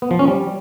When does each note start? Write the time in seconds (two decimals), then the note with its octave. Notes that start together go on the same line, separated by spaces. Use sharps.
0.02 B3
0.11 F3
0.19 C#4
0.28 G3